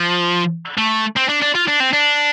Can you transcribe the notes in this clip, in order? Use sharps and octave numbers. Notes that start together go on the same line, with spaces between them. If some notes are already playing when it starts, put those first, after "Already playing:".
Already playing: F3
A3
C4
D4
D4
F4
D4
C4
D4